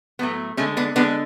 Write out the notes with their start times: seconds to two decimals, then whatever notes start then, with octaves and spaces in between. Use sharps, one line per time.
0.19 A2 F#3 A3 B3
0.57 D3 G#3 A3 C#4
0.77 B3 D4
0.96 D3 G#3 B3 D4